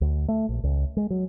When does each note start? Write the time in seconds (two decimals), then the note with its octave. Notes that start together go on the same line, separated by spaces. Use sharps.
0.01 D2
0.28 A3
0.49 A#1
0.64 C#2
0.97 G#3
1.10 F#3